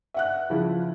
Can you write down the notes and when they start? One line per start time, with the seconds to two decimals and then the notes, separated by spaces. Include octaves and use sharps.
0.14 E5 F#5 F#6
0.50 C#3 F3 E4